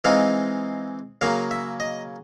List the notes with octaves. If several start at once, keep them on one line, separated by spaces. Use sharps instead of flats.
E3 G#3 C4 D#4 F5
C#3 F#3 A#3 F5
E5
D#5